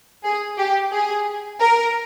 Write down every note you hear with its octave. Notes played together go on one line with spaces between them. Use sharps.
G#4
G4
G#4
A#4